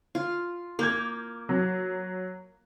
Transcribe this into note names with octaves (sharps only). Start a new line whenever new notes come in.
F4
A#3 A#4 D6 G6 G#6
F#3